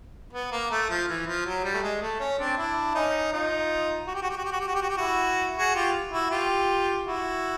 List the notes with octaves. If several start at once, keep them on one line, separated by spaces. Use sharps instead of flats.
B3
A#3
A3
F3
E3
F3
F#3
G3
A3
G#3
A3
C#4
C4 D4
D4 E4
C#4 D#4
D#4 F4
F#4
G4
F#4
G4
F#4
G4
F#4
G4
F#4
G4
F#4
G4
E4 F#4
F#4 G#4
F4 G4
E4 F#4
F4 G4
E4 F#4